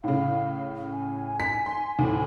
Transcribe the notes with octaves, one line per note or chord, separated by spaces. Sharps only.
A2 C#3 F5
G#5
B6
C6
D2 A2